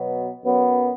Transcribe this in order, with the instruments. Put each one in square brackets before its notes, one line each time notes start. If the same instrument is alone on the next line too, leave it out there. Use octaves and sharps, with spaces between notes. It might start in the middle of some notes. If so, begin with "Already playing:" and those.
Already playing: [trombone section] B2 F#3 B3
F#2 F#3 B3